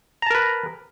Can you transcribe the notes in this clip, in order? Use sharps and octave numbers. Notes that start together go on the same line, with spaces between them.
A#4 B4 A5 A#5